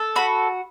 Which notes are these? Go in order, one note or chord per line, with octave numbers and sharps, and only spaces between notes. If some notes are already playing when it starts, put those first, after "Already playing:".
Already playing: A4
F#4 B5